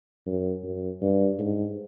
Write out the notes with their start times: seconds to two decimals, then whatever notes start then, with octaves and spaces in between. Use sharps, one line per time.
0.26 F#2
0.63 F#2
1.02 G2
1.39 G#2